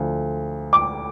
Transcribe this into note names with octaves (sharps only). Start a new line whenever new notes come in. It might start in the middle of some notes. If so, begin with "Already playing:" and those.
Already playing: D2 D3 F3
D6